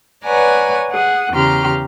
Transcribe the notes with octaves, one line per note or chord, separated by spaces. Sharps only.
B4 C#5 D5 F#5 G#5 A#5
G#4 F#5
E2 C#3 G4 A#5 C6 F6